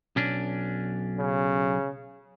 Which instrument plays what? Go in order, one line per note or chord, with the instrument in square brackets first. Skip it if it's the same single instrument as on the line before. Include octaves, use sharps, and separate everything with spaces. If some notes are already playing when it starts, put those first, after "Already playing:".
[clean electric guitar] B1 C#4 D4
[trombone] C#3